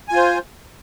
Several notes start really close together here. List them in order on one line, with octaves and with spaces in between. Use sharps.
G#5 F4 C5